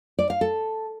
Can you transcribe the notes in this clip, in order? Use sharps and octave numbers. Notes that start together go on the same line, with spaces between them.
D5
F5
A4